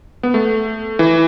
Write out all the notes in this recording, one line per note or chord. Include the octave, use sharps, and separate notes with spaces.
B3
A3
E3